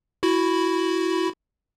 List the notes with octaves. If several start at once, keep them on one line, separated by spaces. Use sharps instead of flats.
E4 F#4 B5